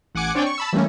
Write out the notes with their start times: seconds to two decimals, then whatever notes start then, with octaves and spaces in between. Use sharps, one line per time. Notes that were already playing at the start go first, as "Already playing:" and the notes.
0.15 A1 F#5 G#5 D6 C#7
0.35 C4 D4 C#5 D5 G5 G#5
0.46 C#6
0.58 A5 B5 E6
0.73 E3 G3 A3 A#3 C#4